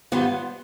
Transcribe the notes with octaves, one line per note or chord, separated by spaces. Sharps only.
G#2 D#3 G3 B3 F4